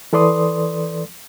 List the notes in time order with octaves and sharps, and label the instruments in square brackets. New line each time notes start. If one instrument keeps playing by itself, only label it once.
[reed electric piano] E3 A4 B4 D5 C6 D#6